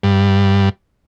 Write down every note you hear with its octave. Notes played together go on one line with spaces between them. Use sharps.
G2